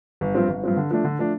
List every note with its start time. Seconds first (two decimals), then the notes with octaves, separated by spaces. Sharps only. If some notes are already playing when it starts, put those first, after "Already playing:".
0.21 G1
0.35 G2 F3 C4
0.49 G1
0.63 G2 F3 C4
0.77 D3
0.91 F3 A3 D4
1.04 D3
1.19 F3 A3 D4